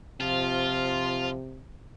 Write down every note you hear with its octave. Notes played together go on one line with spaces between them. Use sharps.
C3 F3 F4